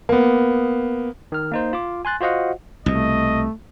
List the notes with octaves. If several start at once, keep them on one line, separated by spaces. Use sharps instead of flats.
A#3 B3
D#3 F6
A#3 D#4 C5
F4 D6
G#5 C6 F#6 A6
F4 F#4 C5 D#5 F5 F#5
C2 B2 A3 D#5